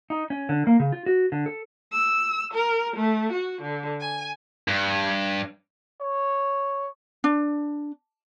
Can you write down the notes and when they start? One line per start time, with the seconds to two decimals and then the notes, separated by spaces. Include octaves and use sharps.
0.10 D#4
0.30 C#4
0.49 D3
0.67 A#3
0.80 C#3
0.93 F4
1.06 F#4
1.32 D3
1.46 A4
1.93 E6
2.54 A#4
2.97 A3
3.32 F#4
3.62 D3
4.01 G#5
4.68 G2
6.01 C#5
7.24 D4